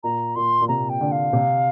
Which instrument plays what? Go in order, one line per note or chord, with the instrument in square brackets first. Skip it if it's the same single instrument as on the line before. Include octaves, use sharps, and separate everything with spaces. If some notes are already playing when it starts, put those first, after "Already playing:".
[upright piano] A#2 [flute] A#5
[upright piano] A#2 [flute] C6
[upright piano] A#2
[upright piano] C3 [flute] A#5
[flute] G5
[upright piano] D3
[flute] F5
[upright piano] C3